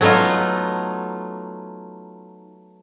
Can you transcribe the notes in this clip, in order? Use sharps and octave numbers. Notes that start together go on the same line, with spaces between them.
F#3 A3 B3 D#4 F4